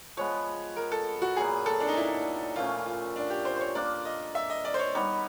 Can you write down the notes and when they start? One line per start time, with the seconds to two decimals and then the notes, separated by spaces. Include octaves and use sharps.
0.17 F3 G#3 B3 C#5
0.76 A#4
0.92 A4
1.22 F#4
1.37 A#2 F#3 B3 G#4
1.66 A4
1.80 D4
1.88 D#4
1.97 E4
2.56 A#2 F3 A3 C#4 F4
2.85 F4
3.16 D4
3.30 G4
3.45 C5
3.56 C5
3.61 C#5
3.75 A#3 D4 F4 D5
4.05 D#5
4.35 E5
4.50 D#5
4.65 D5
4.74 C5
4.79 C#5
4.95 G3 B3 D#4 C#5